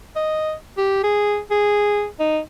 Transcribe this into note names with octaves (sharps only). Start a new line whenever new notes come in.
D#5
G4
G#4
G#4
D#4